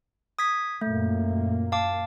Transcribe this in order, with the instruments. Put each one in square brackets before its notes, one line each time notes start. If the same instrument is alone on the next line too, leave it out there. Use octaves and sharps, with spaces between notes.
[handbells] D#6 G#6 B6
[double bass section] F#2 A#2 A#3 [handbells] A3
[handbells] F5 A5 D6